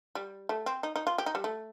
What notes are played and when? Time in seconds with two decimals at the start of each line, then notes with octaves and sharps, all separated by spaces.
0.15 G3
0.49 A3
0.66 C4
0.83 D#4
0.96 D#4
1.07 F4
1.18 G4
1.26 D#4
1.35 G3
1.44 A3